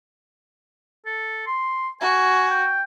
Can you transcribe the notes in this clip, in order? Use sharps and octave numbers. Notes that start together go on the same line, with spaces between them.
A4
C6
F#4 G#5
G5